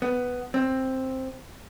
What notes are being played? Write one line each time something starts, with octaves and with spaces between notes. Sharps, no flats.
B3
C4